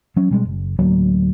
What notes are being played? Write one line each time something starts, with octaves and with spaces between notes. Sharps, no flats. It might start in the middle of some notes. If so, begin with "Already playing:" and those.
F#3 C#4
B2 G3 G#3
F#1
D1 D2 F#3 A#3